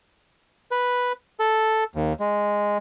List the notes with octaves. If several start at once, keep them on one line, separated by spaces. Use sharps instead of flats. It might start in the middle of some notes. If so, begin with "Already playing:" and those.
B4
A4
D#2
G#3